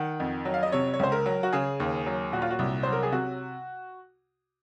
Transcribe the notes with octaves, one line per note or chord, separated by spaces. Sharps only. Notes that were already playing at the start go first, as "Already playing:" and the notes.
Already playing: D#3 F#5
F2
F#3
F5
D#5
C3 C#5
C#5
C#2 C5
A#4
F#3
F#4
C#3 G#4
D#2
F#3
A#2 F#4
F4
F#4
C2
F#3 C5
A#4
G#4
C3 F#4